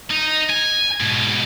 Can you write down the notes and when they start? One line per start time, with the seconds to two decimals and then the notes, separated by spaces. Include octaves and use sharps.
0.11 D#4
0.50 G#5
1.00 G#2 B2